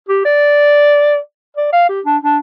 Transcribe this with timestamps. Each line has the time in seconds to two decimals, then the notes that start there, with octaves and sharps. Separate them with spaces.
0.09 G4
0.25 D5
1.57 D5
1.73 F5
1.89 G4
2.05 D4
2.22 D4